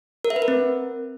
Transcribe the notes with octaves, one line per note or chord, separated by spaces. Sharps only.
A#4
E5
B4
A#4
C4